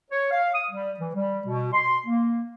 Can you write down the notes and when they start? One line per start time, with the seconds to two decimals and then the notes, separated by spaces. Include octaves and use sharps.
0.11 C#5
0.31 F5
0.54 D#6
0.71 G3
1.00 E3
1.15 G3
1.46 B2
1.72 C6
2.06 A#3